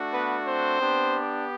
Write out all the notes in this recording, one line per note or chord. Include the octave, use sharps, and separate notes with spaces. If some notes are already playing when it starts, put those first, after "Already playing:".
Already playing: A3 D4 F#4
B3 B4
C4 C5
B3 D4 G4